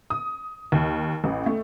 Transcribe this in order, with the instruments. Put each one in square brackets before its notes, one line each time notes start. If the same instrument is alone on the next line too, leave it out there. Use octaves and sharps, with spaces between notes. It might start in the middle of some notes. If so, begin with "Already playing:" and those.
[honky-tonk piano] D#6
D#2
A1
A3